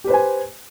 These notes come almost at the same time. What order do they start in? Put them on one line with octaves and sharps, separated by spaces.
G4 B4 C5 G#5